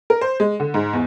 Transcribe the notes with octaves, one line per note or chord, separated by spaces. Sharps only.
A#4
C5
G#3
D3
G#2
E2